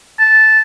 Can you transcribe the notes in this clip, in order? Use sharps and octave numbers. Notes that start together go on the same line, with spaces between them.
A5